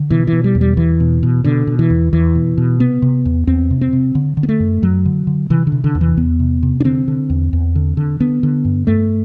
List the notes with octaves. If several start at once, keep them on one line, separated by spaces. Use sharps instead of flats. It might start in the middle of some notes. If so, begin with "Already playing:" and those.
Already playing: D3
B2 E3
E3
B2
G3
E2
G3
E2 E3
B2
B2
B2 D3
B2
E3
E2
E2 E3
B2
B2
C3 B3
C3
E2
E2 C4
C3
C4
C3
D3
D3
B3
A3
F#2
F#2 F#3
D3
D3
C3 E3
D3
C3
D3
E2
E3
E2 B3
C3
C3
D4
D3 C4
D3
E2
E2
D3
D3
D3 B3
D3
G2
G2 A3